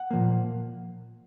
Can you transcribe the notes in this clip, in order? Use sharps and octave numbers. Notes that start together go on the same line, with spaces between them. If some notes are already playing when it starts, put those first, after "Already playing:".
Already playing: F#5
A#2 F3 A#3